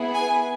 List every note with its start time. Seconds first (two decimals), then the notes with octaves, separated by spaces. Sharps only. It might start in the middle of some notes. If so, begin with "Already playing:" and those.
Already playing: B3 E4 G#4
0.13 G#5